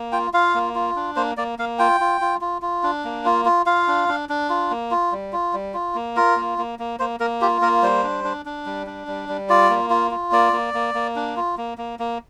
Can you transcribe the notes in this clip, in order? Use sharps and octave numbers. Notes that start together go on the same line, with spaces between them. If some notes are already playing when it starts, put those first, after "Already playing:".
Already playing: A#3
F4 G5
F4 F5
A#3
F4
D4
A#3 C5
A#3 D5
A#3 F5
F4 G5
F4
F4
F4
F4
D4
A#3
F4
F4
F4 F5
D4
D4
D4
F4
A#3
F4
G3
F4
G3
F4
A#3
F4 A#4
A#3
A#3
A#3
A#3 C5
A#3 A#4
F4 G4
A#3 A#4
G3 C5
D4
D4
D4
G3
D4
G3
G3
F4 D5
A#3
F4
F4
A#3 D5
A#3
A#3
A#3
D4
F4
A#3
A#3
A#3